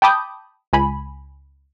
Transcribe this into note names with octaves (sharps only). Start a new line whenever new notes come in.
G5 A5 B5 D6 D#6 G6
C#2 G#5 B5